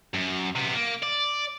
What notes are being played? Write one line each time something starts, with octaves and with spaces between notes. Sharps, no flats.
F#2
C3 B3
A#3
D5